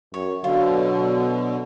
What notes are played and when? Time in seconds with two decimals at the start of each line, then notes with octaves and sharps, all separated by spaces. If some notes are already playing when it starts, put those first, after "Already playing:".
0.14 F#2 C#5
0.44 B2 D3 F#3 F4